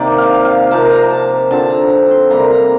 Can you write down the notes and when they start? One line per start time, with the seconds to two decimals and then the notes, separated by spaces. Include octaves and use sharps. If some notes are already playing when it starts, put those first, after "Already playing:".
Already playing: C3 D#3 A#3 D5
0.18 F5
0.45 F5
0.71 C3 F3 A#3 A5
0.91 A#5
1.11 A5
1.51 D3 F3 C4 A5
1.70 A#5
1.90 A#5
2.11 C6
2.30 C3 G3 A#3 A#5
2.50 A#5